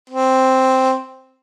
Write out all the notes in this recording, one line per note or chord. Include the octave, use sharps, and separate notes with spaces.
C4